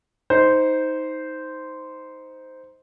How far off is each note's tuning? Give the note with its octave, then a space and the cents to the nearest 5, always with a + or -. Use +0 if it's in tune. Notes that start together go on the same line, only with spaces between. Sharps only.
D#4 +20 C5 -10